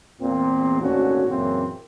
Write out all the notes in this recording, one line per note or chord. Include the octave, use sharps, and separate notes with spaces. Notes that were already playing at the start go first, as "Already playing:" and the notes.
E2 A#2 C4
G#1 D2 A#2 D3 C#4 F#4
F#2 A#2 C#3 E3 A#3 C4